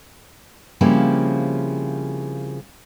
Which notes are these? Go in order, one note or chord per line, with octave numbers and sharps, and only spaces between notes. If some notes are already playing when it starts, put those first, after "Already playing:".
C#3 F3 G3 A#3 C4 E4